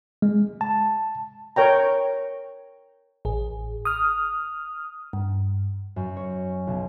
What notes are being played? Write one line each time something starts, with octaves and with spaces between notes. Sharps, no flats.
G#3
A5
A#4 C#5 G5 A#5
A1 G#4
D#6 F6
G2
F#2
C#5
B1